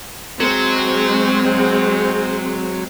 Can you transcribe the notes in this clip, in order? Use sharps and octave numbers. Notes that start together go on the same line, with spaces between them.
F#3 G#3 C4